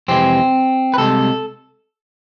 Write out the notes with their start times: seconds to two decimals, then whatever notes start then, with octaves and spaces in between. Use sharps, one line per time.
0.08 F2 C3 E3 G#3 C4
0.94 B4
0.98 C2 C3 G#3 A4